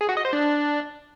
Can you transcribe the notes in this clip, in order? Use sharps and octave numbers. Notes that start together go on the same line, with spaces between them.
G#4
F#4
D#5
C5
D4